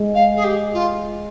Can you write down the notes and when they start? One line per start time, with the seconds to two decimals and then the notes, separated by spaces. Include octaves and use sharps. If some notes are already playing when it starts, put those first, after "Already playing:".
Already playing: G#3
0.14 F5
0.36 G#4
0.44 G4
0.73 F4